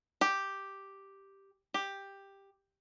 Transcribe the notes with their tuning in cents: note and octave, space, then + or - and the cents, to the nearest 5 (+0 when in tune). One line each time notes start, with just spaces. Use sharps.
G4 +0
G4 +5